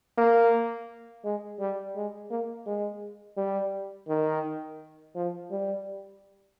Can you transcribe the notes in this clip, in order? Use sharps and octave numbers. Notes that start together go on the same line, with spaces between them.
A#3
G#3
G3
G#3
A#3
G#3
G3
D#3
F3
G3